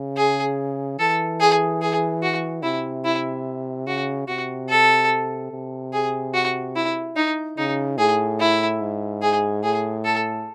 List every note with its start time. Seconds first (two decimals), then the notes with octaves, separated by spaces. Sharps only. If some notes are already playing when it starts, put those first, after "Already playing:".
Already playing: C#3
0.17 G#4
0.99 E3 A4
1.40 G#4
1.82 G#4
2.23 F#4
2.63 C3 E4
3.04 E4
3.87 C#3 F#4
4.28 C3 F#4
4.69 A4
5.51 C3
5.93 G#4
6.34 F#4
6.76 E4
7.16 D#4
7.58 C#3 D#4
7.98 A2 G#4
8.40 E4
8.81 G#2
9.22 G#4
9.63 A2 G#4
10.04 A4